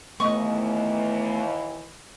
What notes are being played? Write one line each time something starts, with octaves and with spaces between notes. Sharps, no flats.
D#2 E3 A3 B3 D#5 C#6